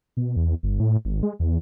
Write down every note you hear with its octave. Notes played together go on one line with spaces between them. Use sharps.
B2
E2
G1
A2
G#1
G#3
E2